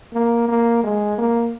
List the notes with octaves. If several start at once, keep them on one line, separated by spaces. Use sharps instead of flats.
A#3
A#3
G#3
A#3